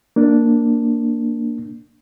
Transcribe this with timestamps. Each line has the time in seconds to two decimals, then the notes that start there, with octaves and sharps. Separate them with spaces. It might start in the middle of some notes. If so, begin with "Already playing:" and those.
0.16 A#3 D4